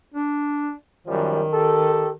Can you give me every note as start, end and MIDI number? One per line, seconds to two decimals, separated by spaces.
0.14 0.73 62
1.07 1.43 42
1.07 2.15 51
1.07 1.43 53
1.07 1.43 55
1.52 2.10 67
1.52 2.10 69